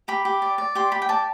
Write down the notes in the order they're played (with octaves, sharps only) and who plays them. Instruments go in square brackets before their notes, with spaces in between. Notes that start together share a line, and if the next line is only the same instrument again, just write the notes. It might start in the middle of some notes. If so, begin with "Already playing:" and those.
[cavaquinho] G4 B5
G4
D5
D5
G4 C6
G4 B5
G5
D5 A5